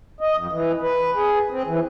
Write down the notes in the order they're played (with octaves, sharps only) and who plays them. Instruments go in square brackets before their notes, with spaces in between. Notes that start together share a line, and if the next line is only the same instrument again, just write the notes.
[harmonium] D#5
F2
E3
B4
G#4
C4
E3